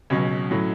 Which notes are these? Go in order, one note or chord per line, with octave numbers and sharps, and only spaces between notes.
C#2 B2 F#3 C#4
A2 F#3